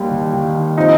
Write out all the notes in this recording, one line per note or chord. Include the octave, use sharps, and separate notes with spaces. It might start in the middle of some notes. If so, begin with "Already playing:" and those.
Already playing: D#2 G3 A#3
D#3
D#3
F3 C4 D#4